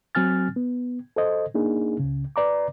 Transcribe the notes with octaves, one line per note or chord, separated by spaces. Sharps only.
F#3 C4 G#5 F6 A6
B3
A4 C5 D#5
A#3 D4 D#4 G#4
C#2 C#3
B4 D5 A#5 D6